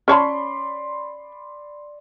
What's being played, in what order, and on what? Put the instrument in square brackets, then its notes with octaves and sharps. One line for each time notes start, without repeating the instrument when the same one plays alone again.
[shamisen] C#4 C#5 A5 [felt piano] D5 B5 C6